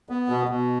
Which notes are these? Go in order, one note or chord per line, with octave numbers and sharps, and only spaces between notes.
B3
B2
B2